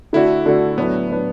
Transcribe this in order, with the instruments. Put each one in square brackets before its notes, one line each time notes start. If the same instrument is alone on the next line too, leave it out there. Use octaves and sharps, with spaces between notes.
[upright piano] D3 A3 F#4 D5 [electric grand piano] E4
[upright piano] D3 A3 F#4 D5
[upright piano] A2 F#3 D4 B4 [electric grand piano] B3
[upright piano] A2 F#3 D4 B4